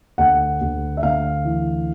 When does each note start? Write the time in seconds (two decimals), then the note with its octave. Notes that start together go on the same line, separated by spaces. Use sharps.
0.18 D2 F#5
0.61 D2
0.97 E5
1.03 D2 F5
1.45 E3